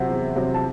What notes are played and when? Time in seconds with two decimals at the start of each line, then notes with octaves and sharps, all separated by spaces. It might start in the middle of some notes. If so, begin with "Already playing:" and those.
Already playing: C3 F#3 C4 C5 F#5
0.09 E2
0.36 C3 F#3 C4
0.54 A5